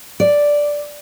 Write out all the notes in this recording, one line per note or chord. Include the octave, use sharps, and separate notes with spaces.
D5